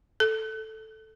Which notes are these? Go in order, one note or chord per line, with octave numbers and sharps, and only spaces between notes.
A4